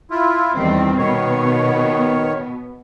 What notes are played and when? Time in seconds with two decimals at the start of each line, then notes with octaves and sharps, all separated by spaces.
0.11 E4 F4
0.56 E2 D#3 G3 C4
0.98 B2 D#3 B3 C#5